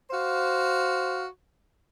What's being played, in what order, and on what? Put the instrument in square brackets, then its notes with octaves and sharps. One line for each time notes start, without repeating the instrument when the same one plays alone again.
[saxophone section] F#4 C5 F5